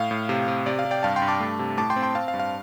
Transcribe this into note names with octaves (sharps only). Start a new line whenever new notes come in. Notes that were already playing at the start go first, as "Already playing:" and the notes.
Already playing: A2 F5
A2
C3
C3
C3 D5
F5
C3
D5 G5
G2 F5 A5
G5 C6
G2
A5 D6
A3
C3
A2 A5 D6
G5 C6
C4
G5 C6
C4 F5 A5
F5
G2
F5